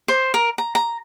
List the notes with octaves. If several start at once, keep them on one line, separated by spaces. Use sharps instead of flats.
C5
A#4
A#5
A#5